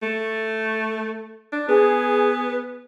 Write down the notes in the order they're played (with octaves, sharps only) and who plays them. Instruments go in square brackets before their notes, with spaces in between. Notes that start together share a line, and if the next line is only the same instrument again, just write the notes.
[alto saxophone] A3
D4
[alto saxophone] B3 [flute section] G#4